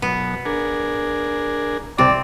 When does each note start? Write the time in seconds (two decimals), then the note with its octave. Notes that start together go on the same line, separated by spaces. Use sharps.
0.02 F#2 B2 B3
0.45 D4 G#4 A#4
1.98 C2 C3 C4 D5